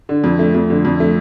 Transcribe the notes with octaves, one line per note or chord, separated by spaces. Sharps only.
D3
F2
A3
F2
D3
F2
A3